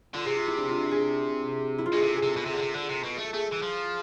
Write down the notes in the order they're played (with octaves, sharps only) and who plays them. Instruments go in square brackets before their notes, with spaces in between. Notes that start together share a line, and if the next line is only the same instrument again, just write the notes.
[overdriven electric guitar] D3 [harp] F4
[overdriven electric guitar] C3 [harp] G#4
[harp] F4
E4
D4
F4
G#4
E4
F4
[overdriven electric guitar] B2 [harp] G#4
[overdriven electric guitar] C3 [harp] A4
[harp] G#4
[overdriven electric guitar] C3 [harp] A4
[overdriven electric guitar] B2
[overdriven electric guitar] C3 [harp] A4
[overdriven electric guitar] D3
C3
D3
C3
B2
A3
[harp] A4
[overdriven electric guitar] A3 [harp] G#4
[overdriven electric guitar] E3
F3